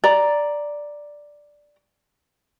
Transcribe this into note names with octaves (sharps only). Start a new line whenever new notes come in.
D5 A#5